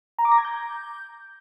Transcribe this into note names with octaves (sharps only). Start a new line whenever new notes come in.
A#5
D6
A#6
G#6
G6